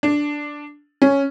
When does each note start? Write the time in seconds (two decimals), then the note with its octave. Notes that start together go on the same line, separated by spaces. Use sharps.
0.03 D4
1.02 C#4